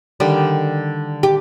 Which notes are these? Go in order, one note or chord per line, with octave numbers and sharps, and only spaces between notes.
D3 D#3 G3
G4